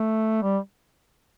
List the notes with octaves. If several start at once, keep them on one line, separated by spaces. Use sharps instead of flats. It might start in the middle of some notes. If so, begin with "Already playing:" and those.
Already playing: A3
G3